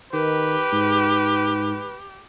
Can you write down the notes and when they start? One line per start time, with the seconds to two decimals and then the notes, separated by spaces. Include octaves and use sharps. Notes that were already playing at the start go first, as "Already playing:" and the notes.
0.13 D#3 G4 B4
0.72 G#2